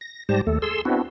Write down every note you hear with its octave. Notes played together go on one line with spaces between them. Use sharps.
A#6
G#2 G3 G4 C5 A5 A#6
D#2 A3 A4
G#4 A4 C6 E6
B3 C4 D4 E4 F#4